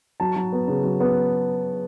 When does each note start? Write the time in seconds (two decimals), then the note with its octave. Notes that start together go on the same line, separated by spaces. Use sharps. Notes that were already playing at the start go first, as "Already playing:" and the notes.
0.20 F#3 A5
0.36 F#3
0.53 B3
0.68 C#3
0.83 F#3
1.00 B3